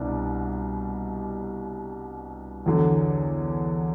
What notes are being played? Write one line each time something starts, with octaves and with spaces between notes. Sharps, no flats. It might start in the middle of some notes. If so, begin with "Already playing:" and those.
Already playing: C2 B2 G3 D4
E2 D3 F#3